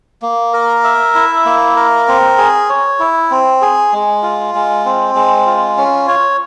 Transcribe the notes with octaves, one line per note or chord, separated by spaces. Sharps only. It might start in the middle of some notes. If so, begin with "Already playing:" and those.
A#3
A#4
E5
E4
A#3
A#4
C4
G#4
C#5
E4
C4
G#4
G#3
F4
G#3
C4
G#3
F4
C#4
C#5